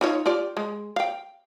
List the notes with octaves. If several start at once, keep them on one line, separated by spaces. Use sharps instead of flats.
D#4 F4 C#5
F4 G4 D5
G#3
F5 G5